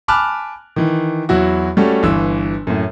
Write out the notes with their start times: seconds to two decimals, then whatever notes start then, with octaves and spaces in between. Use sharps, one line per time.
0.08 G#5 A5 B5 D6 F6 F#6
0.76 D#3 E3
1.29 E2 F#3 E4 F#4
1.77 G3 A3 C#4 F#4
2.03 G1 E3 E6
2.67 F#2 A2